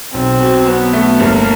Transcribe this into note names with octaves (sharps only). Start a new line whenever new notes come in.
B1 C4
B2
F#3 B3
A3
G1 A#3